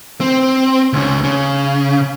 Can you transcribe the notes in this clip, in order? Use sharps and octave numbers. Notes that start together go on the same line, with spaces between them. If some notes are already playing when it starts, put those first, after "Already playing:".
C4
C#2 C#3
C#3